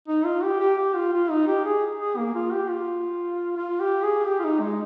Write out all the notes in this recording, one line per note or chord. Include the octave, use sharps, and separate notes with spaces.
D#4
F4
G4
G4
G4
F4
F4
D#4
G4
G#4
G#4
A#3
F4
G4
F4
F4
G4
G#4
G4
F4
D#4
G#3